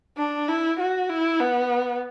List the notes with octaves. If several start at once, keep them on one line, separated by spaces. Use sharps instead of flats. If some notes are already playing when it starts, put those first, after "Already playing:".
D4
E4
F#4
E4
B3